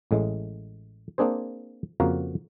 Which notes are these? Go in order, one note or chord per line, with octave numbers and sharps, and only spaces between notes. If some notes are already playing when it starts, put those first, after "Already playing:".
A1 A2 G#3
A#3 C4 D4 G#4 C5
F2 C#3 A#3 F#4 F5 A#5